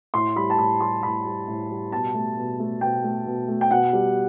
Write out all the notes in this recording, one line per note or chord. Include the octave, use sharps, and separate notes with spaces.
A2 C6
G3 B5
A5
A2 B5
G3 C6
A2 B5
G3
A2
G3
B2 A5
A3
B2
A3
B2 G5
A3
B2
A3
G5
B2 F#5
G3